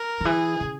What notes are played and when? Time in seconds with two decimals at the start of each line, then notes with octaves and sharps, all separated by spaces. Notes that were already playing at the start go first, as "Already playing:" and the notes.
Already playing: A#4
0.21 D#3
0.25 E3 G#4
0.60 C#3